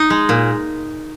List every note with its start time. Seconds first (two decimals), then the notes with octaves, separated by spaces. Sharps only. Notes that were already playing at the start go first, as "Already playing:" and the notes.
Already playing: D#4
0.10 G#3
0.29 A#2